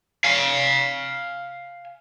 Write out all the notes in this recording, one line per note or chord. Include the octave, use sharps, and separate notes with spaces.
F5 G#5